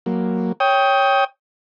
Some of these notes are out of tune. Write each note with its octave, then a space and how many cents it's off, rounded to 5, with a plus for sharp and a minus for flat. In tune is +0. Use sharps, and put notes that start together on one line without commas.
F#3 +0 A#3 +0
C#5 +0 G5 +5 D#6 +25